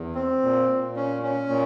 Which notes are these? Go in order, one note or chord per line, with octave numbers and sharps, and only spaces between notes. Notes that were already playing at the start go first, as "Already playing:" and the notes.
Already playing: E2
C4
A#2
A#2
C#4
C#4
A#2